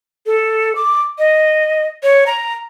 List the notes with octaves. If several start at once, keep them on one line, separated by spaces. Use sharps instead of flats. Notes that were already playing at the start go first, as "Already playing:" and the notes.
A4
D6
D#5
C#5
A#5